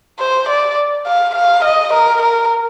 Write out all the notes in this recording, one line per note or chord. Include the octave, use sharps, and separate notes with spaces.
C5
D5
F5
F5
D#5
A#4
A#4